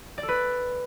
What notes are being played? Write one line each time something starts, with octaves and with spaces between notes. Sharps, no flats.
D5
A4
B4